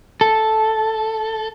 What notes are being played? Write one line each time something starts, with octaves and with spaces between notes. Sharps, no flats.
A4